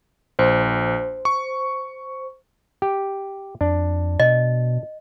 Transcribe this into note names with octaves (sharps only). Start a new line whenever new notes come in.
A#1 C5
C#6
G4
F2 D4
B2 D#5